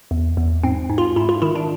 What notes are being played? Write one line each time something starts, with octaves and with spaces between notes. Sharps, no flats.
E2
E2
G#2 C4
G#2
F4
G#2 E4
F4
D#3 E4
D4